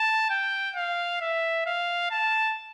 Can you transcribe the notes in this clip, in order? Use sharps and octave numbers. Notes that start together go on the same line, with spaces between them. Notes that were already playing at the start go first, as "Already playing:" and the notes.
Already playing: A5
G5
F5
E5
F5
A5